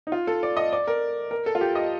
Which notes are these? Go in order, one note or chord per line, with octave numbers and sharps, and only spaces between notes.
D#4
F4
A4
D5
D#5
D5
A#4
A#4
A4
F4
G4
D#5